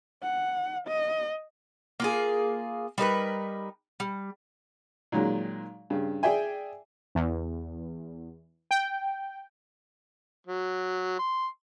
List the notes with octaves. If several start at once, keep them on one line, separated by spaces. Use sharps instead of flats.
F#5
D#5
A#3 F4 G#4
G3 D#4 A#4 B4
G3
A#2 D#3 F#3 G#3
G2 C#3
G#4 D5 E5 G5 G#5
E2
G5
F#3
C6